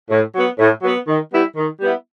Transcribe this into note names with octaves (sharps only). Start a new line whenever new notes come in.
A2
F#3 B3
A2
F#3 B3
D#3
G3 B3 E4
D#3
G3 B3 E4